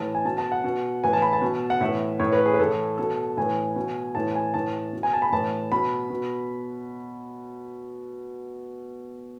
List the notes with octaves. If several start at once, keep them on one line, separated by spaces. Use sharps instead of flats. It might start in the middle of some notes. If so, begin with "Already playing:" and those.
Already playing: A2 E3 A5
G#5
B2 A5
A5
F#5
B2
A2 E3 G#5
A5
B5
A5
B2
F#5
A2 E3 E5
A2 E3 C#5
B4
G#4
B4
A2 E3 A4
B2 A4
A2 E3 G#5
B2
A2 E3 A5
G#5
A2 E3 A5
B2
G#5
A5
B5
A2 E3 A5
B2 B5
B2